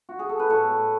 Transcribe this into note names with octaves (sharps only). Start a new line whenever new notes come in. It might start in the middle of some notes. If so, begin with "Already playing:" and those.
F#4
G#4
A4
B4
A2 A4 C#5
A2